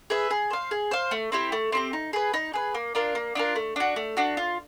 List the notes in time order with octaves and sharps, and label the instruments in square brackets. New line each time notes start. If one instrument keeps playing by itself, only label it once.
[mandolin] G#4 B4 E5
G#4
C5 F5
G#4
C5 F5
A3
C4 E4 G4
A3
C4 E4 G4
D#4
G#4 B4
D#4
G#4 B4
A#3
D4 F4 A#4
A#3
D4 F4 A#4
A3
D4 F#4
A3
D4 F#4
F4